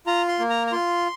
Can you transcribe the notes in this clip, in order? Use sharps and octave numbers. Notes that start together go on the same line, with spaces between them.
F4 A#5
C6
A#3
A#5
A#5
F4 C6